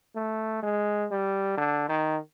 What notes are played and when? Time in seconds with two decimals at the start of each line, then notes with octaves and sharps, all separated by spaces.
0.15 A3
0.62 G#3
1.10 G3
1.57 D3
1.88 D#3